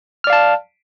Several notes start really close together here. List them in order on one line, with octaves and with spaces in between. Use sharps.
F6 D5 F5 A5